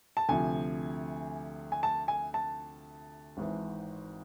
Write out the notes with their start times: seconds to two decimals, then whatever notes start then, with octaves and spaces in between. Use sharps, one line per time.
0.17 A5
0.29 D2 C3 F3 G#5
1.72 G#5
1.83 A5
2.08 G#5
2.34 A5
3.37 G#1 G#2 E3